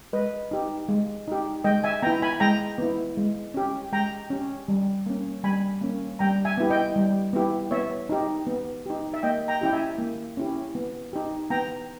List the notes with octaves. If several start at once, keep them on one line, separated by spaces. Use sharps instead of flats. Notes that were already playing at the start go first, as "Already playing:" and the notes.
G#3 B4 D#5
D#4 G4
G#3
D#4 G4
G#3 D#5 G5
E5 G#5
B3 E4 G5 A#5
G#5 B5
G#3 G5 A#5
B3 E4
G#3
C#4 G4
G#3 G5 A#5
C#4 G4
G3
A#3 C#4
G3 G#5 B5
A#3 C#4
G3 G5 A#5
E5 G#5
B3 E4 G4
D#5 G5
G3
B3 E4 G4
B3 C#5 E5
D#4 G4
B3
D#4 G4
E5
A#3 D#5 G5
G5 A#5
C#4 E4 G4 G5
E5 G#5
A#3
C#4 E4 G4
B3
D#4 G4
B3 G5 A#5